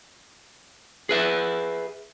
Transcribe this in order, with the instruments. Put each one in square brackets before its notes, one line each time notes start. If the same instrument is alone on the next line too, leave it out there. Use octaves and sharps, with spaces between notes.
[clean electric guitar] G#4 B4 E5